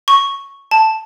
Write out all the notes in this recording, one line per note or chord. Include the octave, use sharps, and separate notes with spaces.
C#6
A5